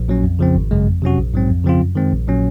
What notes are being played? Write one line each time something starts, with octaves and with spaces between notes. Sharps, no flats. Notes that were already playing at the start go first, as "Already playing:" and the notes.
Already playing: A#1
A#2 F#3 C#4
F2
C#3 F3 C4
G#1
F#2 C#3 G#3
F2
C3 F#3 C#4 F#4
A#1
G#2 F#3 C4
F2
C#3 F3 C4 F4
F#2
D#3 G#3 C4
A#1
A#2 F#3 C#4